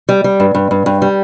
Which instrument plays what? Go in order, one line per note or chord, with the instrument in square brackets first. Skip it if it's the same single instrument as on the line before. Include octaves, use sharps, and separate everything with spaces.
[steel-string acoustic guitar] G3
G3
G2
G2
G2
G2
G3